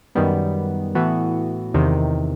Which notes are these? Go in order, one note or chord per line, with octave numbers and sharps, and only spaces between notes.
F#2 D#3 G3 B3
A2 E3 B3 F#4
E2 C3 D#3